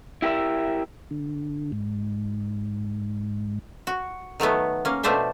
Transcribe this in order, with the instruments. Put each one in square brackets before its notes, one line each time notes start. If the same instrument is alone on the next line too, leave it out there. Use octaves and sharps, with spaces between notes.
[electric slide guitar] E4 G4 A#4 E5
[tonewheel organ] D3
G#2
[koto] F#4
D#3 F#3 A3 B3
A#3 C#4
B2 F3 A3 D4 C5 E5